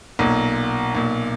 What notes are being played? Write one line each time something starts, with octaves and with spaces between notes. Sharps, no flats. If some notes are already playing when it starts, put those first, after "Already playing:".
B1 A#2
B1 A#2